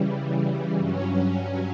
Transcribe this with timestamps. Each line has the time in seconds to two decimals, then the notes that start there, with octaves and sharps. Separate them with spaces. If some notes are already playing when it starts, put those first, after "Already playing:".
Already playing: C#3 E3 G3
0.77 G2 F#3 C#4